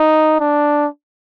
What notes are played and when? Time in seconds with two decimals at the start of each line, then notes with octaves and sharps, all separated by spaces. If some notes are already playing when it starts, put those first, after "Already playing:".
Already playing: D#4
0.40 D4